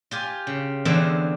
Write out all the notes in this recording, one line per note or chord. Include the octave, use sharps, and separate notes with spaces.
F4 G4 G#5
C#3
E2 D3 E3 C4 D4 F5